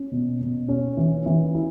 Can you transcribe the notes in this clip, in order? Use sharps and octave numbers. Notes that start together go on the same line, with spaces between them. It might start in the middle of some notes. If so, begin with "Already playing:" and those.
Already playing: C#4
B2
B2
C#4
E3
E3
E4